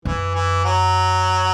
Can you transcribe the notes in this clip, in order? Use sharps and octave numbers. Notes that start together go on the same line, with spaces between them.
F#2 E3
E3
F#3